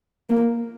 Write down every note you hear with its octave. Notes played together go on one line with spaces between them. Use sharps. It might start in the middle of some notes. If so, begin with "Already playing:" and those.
A#3